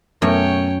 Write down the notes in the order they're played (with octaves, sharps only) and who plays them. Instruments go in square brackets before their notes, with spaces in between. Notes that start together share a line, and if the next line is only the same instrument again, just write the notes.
[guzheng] F#2 [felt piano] B2 A3 [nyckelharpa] C#5 G5